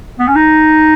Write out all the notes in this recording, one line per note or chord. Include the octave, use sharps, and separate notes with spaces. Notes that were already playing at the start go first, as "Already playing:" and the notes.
B3
C#4
D#4